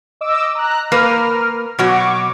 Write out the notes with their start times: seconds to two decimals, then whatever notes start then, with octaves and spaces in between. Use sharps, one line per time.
0.21 D#5 D6 E6
0.55 A#5 F#6
0.92 A#3 A#4 B4 F6
1.79 B2 F#3 F#4 C#6 D6